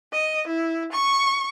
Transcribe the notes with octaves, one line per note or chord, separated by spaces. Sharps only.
D#5
E4
C#6